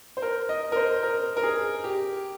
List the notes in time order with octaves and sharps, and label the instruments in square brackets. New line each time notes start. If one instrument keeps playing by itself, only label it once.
[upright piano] C5
A#4
D#5
A#4
C5
A#4
A#4
G#4
G4